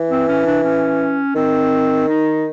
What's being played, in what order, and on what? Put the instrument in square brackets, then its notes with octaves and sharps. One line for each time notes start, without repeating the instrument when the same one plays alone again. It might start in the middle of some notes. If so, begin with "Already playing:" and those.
Already playing: [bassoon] E3
[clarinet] C4
C#4
D4
C#4
[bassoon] D#3 [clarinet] C4
[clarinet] D#4